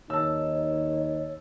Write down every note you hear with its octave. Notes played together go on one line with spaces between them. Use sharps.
D#2 D#4 C#5 A5 E6